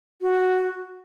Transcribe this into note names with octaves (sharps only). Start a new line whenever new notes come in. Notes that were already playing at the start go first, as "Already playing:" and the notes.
F#4